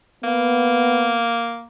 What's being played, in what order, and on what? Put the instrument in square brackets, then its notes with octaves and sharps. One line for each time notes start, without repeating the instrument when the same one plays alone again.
[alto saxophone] A#3 [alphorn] B3